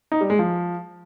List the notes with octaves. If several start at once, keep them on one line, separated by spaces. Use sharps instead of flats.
D#4
G3
G#3
F3